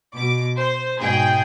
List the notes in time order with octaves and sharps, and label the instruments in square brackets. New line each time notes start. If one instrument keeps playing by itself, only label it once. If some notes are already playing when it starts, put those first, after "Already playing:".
[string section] B2 D6
C5
G#2 B2 G#4 G5